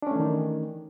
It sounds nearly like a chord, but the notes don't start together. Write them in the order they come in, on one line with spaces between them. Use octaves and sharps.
D4 C#4 A3 E3 D#3